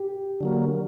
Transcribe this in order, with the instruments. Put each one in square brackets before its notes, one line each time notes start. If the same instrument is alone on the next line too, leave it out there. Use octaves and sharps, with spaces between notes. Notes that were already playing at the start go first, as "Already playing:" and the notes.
Already playing: [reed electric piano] G4
[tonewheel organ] D3 F#3 A#3